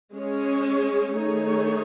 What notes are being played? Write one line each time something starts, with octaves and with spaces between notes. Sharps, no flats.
G#3 C#4 G#4 C#5
D#3 A3 D#4 G#4 C#5